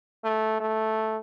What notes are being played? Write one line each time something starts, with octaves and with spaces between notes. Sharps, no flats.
A3
A3